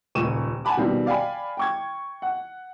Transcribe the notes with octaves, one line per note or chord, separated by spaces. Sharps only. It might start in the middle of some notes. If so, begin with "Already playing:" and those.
D#1 C#2 A#2 C#6 D#7 E7
F#5 G#5 A5 B5 D6
B2 D#3 G3 C4 F4
D5 F5 G5 G#5 B5
G5 C#6 G#6
F#5